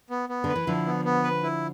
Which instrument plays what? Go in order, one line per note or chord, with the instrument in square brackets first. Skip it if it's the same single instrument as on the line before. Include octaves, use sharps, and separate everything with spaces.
[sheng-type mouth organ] B3
B3
[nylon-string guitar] D3 [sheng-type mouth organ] B4
[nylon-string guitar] E3
[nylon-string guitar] D3 F3 [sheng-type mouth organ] E4
[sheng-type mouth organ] B3
B3
B4
E4